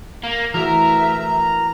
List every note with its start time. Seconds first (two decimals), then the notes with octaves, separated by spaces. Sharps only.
0.23 A#3
0.54 E3 A3 F#4 A#4 E5 A#5